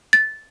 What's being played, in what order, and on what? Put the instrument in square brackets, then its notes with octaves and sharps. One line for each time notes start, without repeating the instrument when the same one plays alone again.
[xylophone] A6